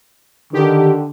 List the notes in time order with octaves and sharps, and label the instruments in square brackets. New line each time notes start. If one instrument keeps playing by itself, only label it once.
[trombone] D3 [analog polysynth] D#3 G4